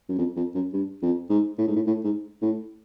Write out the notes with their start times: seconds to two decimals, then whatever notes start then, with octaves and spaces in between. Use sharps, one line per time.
0.09 F#2
0.18 F2
0.36 F2
0.55 F#2
0.73 G2
1.02 F2
1.30 G#2
1.58 A2
1.68 G#2
1.76 A2
1.87 A2
2.04 G#2
2.42 A2